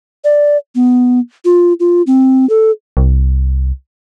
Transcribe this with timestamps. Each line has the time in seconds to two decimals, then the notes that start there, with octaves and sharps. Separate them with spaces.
0.24 D5
0.75 B3
1.45 F4
1.80 F4
2.07 C4
2.49 A4
2.97 C2